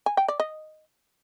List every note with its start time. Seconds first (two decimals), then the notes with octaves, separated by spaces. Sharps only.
0.06 G#5
0.17 G5
0.28 D5
0.40 D#5